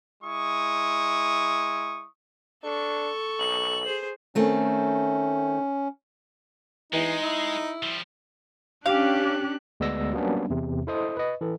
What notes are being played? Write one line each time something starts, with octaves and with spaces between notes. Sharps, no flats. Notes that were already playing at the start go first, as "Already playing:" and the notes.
G#3 E4 C#6 D#6
D4 A4 C#6
B1 F#7
G#4 C5
D#3 A3 C4 C#4
E3 G#3 D#4
E4
F3 G3
C#4 D4 G4 F5 F#6
D2 G#3 B3 D5 E6 A#6
F#3 G3 A#3 B3 C#4 D4
E2 C3
E4 A4 C5 D#5 D#6
B4 D#5
E3 A4